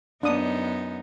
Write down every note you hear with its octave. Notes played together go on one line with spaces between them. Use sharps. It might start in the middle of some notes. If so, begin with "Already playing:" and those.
F#2 B3 D4 D#4 D#6